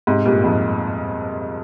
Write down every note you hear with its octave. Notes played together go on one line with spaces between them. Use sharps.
G#2 C3
G2 A#2
F2 G#2